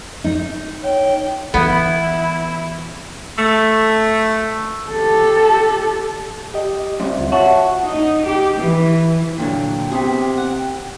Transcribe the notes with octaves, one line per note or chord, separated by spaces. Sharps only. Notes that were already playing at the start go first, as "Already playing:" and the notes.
D#4
C#5 G5
E3 B3 E4
A3
G4 A4
G4 D#5
C2 F#2
D2 F4
F#4 C#5 E5 A5
D#4
G4
E3
A#2 D3 F#3 G5
C3 B3 G#4
F#5 G5